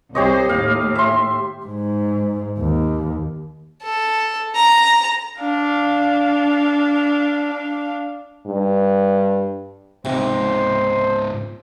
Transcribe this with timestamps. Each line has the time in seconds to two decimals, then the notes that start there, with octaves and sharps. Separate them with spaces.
0.15 C2 G4 C5 C#5 D#5
0.49 D#2 A2 F5
0.95 E5 C6
1.66 G#2
2.59 D#2
3.82 A4
4.55 A#5
5.39 D4 F5
8.46 G2
10.05 C#2 G#2 C3 C5